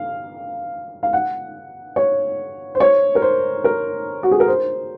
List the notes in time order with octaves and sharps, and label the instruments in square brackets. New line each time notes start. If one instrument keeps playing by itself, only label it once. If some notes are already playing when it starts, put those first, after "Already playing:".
Already playing: [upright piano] F5
F5
F#5
C#5
C5
C#5
A#4
C5
A#4
F#4
G#4
A#4
C5